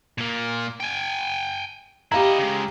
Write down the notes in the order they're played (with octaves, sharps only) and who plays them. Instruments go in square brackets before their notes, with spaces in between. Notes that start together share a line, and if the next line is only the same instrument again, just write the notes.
[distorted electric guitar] A#2 A#3
G5 G#5
[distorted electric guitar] E4 D#5 [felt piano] G4 F5 A#5
[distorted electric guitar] C#3 G#3